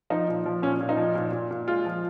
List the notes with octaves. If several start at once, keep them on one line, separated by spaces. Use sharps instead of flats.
F3 D#4
A#2
F3
A#2 C#4
A#2
D#4
F3
A#2
A#2
A#2
G#3 F4
F3